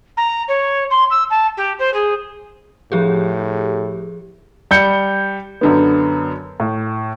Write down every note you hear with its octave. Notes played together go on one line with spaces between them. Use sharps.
A#5
C#5
C6
E6
A5
G4
C5
G#4
A2 F3 G4 G#4
G3 G6 C#7
F#2 D3 B3
A2